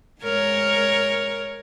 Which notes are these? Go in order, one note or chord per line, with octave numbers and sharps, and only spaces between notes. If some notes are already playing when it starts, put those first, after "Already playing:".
G#2 A#4 C#5